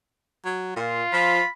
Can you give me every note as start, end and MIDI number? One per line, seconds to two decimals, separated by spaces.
0.45 0.74 54
0.76 1.03 46
0.76 1.47 65
1.13 1.40 53
1.13 1.48 83